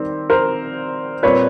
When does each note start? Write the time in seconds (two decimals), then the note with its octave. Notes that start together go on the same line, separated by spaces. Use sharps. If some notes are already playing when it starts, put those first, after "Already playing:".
Already playing: D#3 G3 C4
0.30 A#4 C5
1.23 A#2 G3 C4 B4 C#5